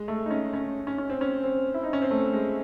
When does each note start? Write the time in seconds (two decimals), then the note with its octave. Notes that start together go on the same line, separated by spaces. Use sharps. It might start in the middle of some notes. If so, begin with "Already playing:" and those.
Already playing: G#3
0.08 A3
0.26 D#4
0.30 C#4
0.53 C#4
0.87 C#4
0.98 C#4
1.10 C4
1.21 C#4
1.44 C4
1.74 E4
1.83 D#4
1.93 C#4
2.02 C4
2.11 A3
2.33 G#3